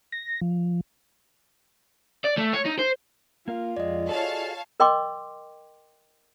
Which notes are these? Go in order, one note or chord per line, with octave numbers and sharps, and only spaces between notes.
A#6
F3
D5
A3
C#5
D#4
C5
A#3 F4 A#4 F5
F2 G#3 D5 D#5
F#4 G#4 A4 C#5 F5 A5
A#4 D#5 G5 C6 D6